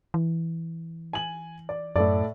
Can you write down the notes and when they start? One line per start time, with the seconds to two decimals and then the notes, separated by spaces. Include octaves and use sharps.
0.14 E3
1.13 G#5 F#7
1.69 D5
1.96 F#2 A2 A4 D5